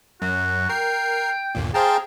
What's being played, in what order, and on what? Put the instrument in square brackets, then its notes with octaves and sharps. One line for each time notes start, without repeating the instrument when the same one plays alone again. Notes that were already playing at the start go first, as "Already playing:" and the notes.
[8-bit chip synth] F#2 [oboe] F#4
[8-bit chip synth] A#4 C7 [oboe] G5
[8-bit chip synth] G1 D#2 A#2
[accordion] G#4 G5 A#5 [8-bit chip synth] C5 F5 A5